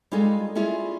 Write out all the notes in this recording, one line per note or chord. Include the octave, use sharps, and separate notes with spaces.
G3 G#3 D#4 F4 G#4 A4
C#4 E4 F4 G#4 D5